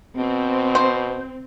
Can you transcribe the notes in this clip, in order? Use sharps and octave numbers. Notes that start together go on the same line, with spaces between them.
B2 C4
C5